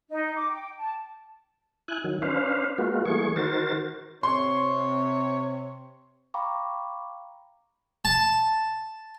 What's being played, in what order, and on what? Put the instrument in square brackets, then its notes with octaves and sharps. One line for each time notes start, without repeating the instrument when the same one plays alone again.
[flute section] D#4
D6
G5
A5
[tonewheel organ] E4 G#5 F#6
D#3 F#3
C#4 D4 B4 C5 F5
G#3 A#3 B3 F4 F#4
E3 G3 A3 A#3 G#4 C#6
D#3 F#4 A#4 C5 A6
[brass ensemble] C3 [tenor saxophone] C#5 [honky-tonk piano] C6
[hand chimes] F5 G5 A#5 B5 C#6 D6
[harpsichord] A5